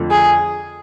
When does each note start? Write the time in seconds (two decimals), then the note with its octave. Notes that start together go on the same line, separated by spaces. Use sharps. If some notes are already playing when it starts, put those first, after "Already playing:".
Already playing: F2 D3 F3 A3
0.11 G#4